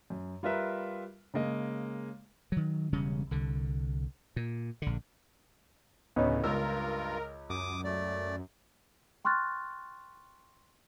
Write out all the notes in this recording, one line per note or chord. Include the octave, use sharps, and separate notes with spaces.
F#2
G3 F4 A#4 B4 E5
C#3 G#3 A#3 D#5
D#3 F#3
E1 C#3 G3 C#4
C2 D3
A#2
A#1 D3
D2 A2 C#3 B3 C#4 D#4
C#2 G2 F4 A#4 E6
F#2 D6 D#6
A3 D5
G5 C6 C#6 F6 F#6 A6